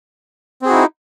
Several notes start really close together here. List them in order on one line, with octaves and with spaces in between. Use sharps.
C4 G#4 F#4 E4 D#4